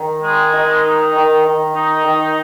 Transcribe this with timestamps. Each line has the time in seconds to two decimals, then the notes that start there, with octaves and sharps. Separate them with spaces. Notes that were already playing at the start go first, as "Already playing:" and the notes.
Already playing: D#3
0.23 G#3
0.54 D#3
0.84 D#4
1.14 D#3
1.44 D#3
1.75 D#4
2.05 D#3